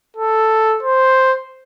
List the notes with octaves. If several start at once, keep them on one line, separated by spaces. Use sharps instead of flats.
A4
C5